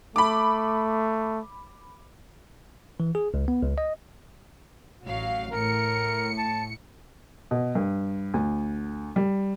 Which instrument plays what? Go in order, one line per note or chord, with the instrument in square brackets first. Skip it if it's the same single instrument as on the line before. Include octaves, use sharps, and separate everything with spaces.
[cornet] A3 [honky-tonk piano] B5 D6
[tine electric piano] E3
G#4
C#2
B3
C#2
D#5
[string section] A1 F#3 F5
[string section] A2 C#7 [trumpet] A#4
[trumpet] A5
[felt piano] B2
G2
D2
G3